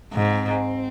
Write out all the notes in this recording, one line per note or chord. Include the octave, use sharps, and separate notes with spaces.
G#2 C4